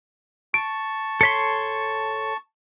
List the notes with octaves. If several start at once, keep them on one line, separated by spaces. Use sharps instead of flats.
A5 C#6 D7
A4 C#5 C6 B6 C#7